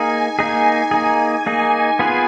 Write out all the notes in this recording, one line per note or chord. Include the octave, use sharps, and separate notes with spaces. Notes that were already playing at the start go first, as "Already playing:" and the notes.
Already playing: A#3 D#4 G#4 G#5
A#3 D#4 G#4
A#3 D#4 G#4
A#3 D#4 G#4
B3 F4 G#4 B4